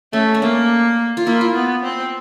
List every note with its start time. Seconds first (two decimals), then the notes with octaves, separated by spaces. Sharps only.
0.13 A3 C#4
0.34 C#4
0.42 A#3 D4
1.17 F4
1.26 A#3 E4
1.41 F4
1.55 B3
1.83 C4